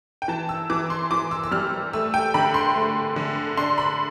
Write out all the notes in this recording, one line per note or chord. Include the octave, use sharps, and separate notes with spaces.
G5
E3 A5
E6
E3 D6
C6
E3 D6
E6
E6
G3 F6
A3 E6
G5
D3 B5
C6
A3
D3
D4 C6
B5